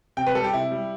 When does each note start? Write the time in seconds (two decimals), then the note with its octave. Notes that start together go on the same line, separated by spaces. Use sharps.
0.17 C3 G5
0.26 B4
0.35 G3 A4
0.44 G4
0.53 C3 E4
0.71 G3